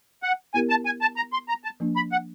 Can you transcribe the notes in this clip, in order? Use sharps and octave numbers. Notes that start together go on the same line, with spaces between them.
F#5
B3 E4 G4 A#4 G#5
A5
G#5
A5
A#5
C6
A#5
A5
F3 A#3 D4
B5
F#5